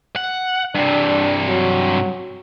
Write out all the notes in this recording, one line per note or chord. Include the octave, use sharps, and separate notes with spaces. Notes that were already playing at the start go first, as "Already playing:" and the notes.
F#5
G2 C3 D4
F#3